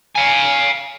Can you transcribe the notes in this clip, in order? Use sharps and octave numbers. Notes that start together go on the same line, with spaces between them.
F5 G#5